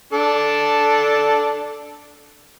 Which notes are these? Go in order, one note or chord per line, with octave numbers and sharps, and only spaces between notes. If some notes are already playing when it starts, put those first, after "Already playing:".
D4 A4